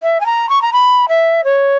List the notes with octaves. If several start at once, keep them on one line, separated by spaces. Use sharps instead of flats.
E5
G#5
A#5
C#6
A#5
B5
E5
C#5